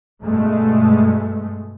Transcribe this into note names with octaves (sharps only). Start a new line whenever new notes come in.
G2 B2 G#3 A3